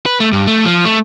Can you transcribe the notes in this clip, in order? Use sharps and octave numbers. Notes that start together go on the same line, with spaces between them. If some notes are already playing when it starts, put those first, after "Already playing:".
B4
A3
G2
A3
F3
A3